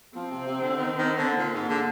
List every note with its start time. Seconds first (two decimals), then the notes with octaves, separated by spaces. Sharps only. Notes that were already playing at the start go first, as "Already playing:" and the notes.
0.16 F3 C4
0.31 C3
0.47 C3
0.61 D3
0.77 D#3
0.98 D#3
1.18 D3
1.38 A#2 A#3
1.54 G#2
1.70 D3